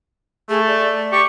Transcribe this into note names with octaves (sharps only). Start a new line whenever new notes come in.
A3 G#4
D5
G4 C#6